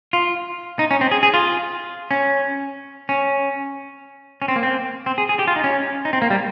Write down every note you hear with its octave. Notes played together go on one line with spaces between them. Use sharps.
F4
D#4
C#4
C4
G#4
G#4
F4
C#4
C#4
C#4
C4
A#3
C4
C4
G#4
G#4
G4
F4
D#4
C#4
D#4
C4
A#3
G3